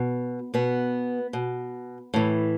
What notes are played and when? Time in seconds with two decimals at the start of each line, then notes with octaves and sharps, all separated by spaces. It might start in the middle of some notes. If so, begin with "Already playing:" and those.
Already playing: B2
0.54 B2 B3
1.33 B2
2.14 A2 E3